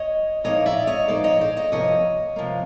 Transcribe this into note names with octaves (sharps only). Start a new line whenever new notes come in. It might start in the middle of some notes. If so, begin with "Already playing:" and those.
Already playing: C#5 D#5
A#2 F3 A#3 D#4 C#5 D#5
D5 E5
C#5 D#5
A#2 F3 A#3 D#4 C5 D5
C#5 D#5
C5 D5
C#5 D#5
C3 F3 A#3 C#5 D#5
C3 F3 A#3